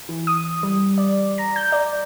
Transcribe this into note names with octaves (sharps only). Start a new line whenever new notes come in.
E3
D#6
G3
D5
A#5
G6
D5